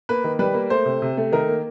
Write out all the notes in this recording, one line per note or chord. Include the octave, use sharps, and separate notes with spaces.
A#3 B4
D#3
G3 B4
A#3
A3 C5
C3
C3
A3
D#3 A#4
A#3